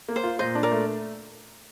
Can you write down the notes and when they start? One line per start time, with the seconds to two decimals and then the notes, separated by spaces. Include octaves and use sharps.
0.08 A#3
0.16 C5
0.23 F4
0.39 A#2 C5 D#5
0.55 D4
0.63 A#4 D5
0.71 A3